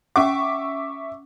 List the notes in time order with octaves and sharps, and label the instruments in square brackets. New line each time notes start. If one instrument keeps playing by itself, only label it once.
[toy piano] C#4 F#5 [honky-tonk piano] E5 C#6 D6